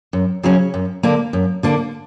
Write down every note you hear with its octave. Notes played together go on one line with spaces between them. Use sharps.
F#2
C#3 F#3 C#4
F#2
D3 A#3 D4
F#2
D3 A#3 D4